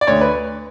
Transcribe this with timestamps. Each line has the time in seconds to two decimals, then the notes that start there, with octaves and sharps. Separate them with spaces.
0.01 D5
0.07 D2 C#5
0.21 B4